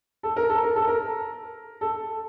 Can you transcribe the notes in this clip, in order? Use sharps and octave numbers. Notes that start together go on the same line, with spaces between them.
A4
A#4
A4
A#4
A4
A#4
A4